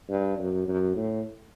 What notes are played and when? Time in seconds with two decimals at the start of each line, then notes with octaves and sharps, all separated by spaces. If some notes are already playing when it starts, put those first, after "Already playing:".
0.09 G2
0.38 F#2
0.68 F#2
0.96 A2